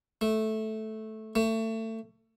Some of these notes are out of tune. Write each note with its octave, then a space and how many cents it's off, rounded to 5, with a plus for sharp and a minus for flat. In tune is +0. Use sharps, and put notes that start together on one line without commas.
A3 -10
A3 +25